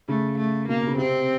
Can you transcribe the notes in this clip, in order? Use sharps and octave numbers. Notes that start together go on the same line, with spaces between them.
C#3 A3
A3
B2 A#3
C#3
C3 C4